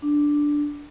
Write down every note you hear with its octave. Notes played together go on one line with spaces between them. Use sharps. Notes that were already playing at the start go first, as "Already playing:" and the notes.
D4